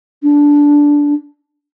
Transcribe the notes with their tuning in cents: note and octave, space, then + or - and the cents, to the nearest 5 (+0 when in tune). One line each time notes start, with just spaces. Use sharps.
D4 -10